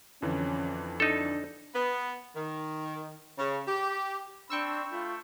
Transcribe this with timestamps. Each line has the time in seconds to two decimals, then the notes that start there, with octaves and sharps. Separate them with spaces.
0.22 F2 D3 E3 C#4
1.00 D4 D#4 A4
1.75 B3
2.36 D#3
3.38 C#3
3.68 G4
4.50 C4 D4 G5 B5 C#6 E6
4.91 A3 F4